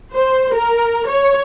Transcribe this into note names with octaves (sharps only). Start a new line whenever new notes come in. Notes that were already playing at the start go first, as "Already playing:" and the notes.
C5
A#4
C#5